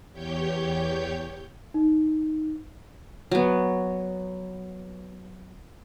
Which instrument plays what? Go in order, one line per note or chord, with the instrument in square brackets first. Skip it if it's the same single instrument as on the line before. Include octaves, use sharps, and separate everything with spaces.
[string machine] E2 G4 C#5 G6
[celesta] D#4
[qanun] F#3 B3